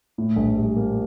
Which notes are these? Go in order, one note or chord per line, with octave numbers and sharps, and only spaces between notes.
A2
A#1
G3
A#3